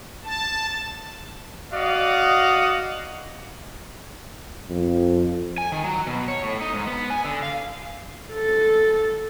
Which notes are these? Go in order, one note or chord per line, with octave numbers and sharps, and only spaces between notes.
A5
F#4 D5 D#5 F5 F#5
F2
G#5
D#3
F#3
B2
C#5
A2
D#4
G#2
B3
G#5
D3
F5
A4